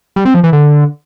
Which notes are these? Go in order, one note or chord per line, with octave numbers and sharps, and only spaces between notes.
G3
C4
F3
E3
D3